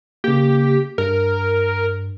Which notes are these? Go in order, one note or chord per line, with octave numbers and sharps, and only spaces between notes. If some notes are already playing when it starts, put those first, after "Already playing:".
C#3 A#3 G4
G2 A#4